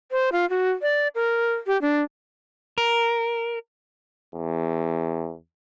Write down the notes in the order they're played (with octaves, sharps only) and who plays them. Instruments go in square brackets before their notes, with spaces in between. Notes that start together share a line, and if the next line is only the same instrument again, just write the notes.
[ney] C5
F4
F#4
D5
A#4
G4
D4
[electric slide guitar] A#4
[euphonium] E2